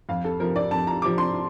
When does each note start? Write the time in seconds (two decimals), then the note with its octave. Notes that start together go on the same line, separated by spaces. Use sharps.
0.09 F2 F5
0.24 A4
0.40 C3 F3 A#4
0.56 D5
0.71 F2 A5
0.87 A#5
1.02 C3 F3 D6
1.18 C6